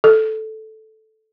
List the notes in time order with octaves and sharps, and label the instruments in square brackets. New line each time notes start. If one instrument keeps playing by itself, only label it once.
[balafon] A4